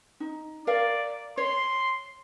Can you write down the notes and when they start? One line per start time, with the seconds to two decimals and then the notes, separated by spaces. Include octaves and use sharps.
0.20 D#4
0.67 A#4 D5 F5
1.38 C#5 C6